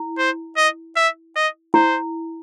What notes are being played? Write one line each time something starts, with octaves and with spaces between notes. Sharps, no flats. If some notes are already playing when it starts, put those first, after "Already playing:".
Already playing: E4
C5
D#5
E5
D#5
E4 C5